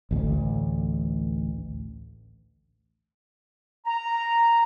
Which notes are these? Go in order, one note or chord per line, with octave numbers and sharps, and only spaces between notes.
A1 D2
A#5